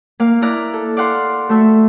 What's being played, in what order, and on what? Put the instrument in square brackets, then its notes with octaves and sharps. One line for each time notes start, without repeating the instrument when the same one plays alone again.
[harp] A#3 F5
E4 D5 A#5 F#6
A4
D5 F5 F#5 C6
A3 F#4 A4 E5